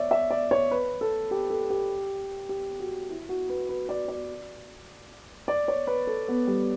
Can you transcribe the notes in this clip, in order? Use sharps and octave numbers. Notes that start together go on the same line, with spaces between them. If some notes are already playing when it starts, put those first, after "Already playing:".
Already playing: C#5 D5 E5
E5
D5
C#5
B4
A4
G4
A4
G4
G4
F#4
E4
F#4
B4
B4
D5
D5
D5
C#5
B4
A4
B3
G3